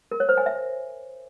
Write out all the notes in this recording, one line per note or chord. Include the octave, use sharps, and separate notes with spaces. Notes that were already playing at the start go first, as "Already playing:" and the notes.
A#4
C#5
C5
G#5
E5